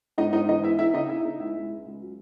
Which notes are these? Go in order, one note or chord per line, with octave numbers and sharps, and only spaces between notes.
G#2 D#4 D#5
G#2 D#4 D#5
E3 D#4 D#5
B3 E4 E5
D#4 E4 E5
C#3 D#4 D#5
D#4 E4 E5
D#4
C#2 E4 E5
G#3
C#2
C#2
F#3